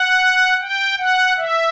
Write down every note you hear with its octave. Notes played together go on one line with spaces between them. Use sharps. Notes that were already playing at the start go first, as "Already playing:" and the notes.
Already playing: F#5
G5
F#5
E5